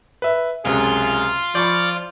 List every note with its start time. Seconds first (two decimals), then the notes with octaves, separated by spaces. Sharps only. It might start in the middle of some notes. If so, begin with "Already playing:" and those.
0.22 B4 E5
0.65 C#2 F#2 C3 F4 G#4
1.55 F3 D5 B5 C#6 D6 G6 C#7